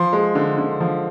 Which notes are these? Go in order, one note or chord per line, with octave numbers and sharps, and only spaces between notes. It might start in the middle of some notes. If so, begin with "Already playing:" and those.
Already playing: F3 C6
G#3
D3
D3
F3